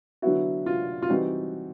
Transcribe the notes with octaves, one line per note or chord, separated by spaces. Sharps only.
D3 F#3 B3 E4 F#4
F4
F4
E3 G3 C4 D#4 F#4